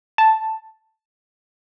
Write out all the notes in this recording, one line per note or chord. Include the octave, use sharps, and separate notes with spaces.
A5